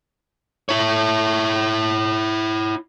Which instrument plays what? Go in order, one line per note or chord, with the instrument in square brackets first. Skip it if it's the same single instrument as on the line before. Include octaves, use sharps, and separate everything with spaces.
[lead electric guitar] E4 C#5